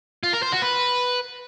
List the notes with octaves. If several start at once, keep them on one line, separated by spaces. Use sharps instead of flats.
F4
A#4
C5
F#4
B4